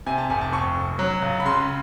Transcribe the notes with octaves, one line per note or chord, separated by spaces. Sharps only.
C3 G#5
A5
F1 G#5
A5
F2 C#6
F1
F#3
C#2
B5
C#3 C6